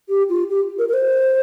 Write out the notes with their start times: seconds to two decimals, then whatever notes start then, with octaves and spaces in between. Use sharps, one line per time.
0.09 G4
0.29 F4
0.50 G4
0.79 A#4
0.89 A#4
0.93 C5